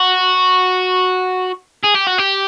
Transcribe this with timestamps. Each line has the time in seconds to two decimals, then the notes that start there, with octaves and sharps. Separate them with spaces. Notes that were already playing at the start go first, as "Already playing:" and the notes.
Already playing: F#4
1.84 G#4
1.95 G4
2.07 F#4
2.18 G4